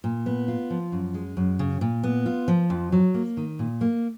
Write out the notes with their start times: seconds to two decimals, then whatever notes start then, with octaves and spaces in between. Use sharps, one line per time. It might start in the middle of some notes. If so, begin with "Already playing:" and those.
0.04 A#2
0.26 B3
0.48 F4
0.70 F3
0.92 F#2
1.14 G#3
1.37 F#2
1.59 C#3
1.81 A#2
2.04 B3
2.26 F4
2.48 F3
2.70 F2
2.92 F#3
3.14 A#3
3.37 D#3
3.59 A#2
3.81 A#3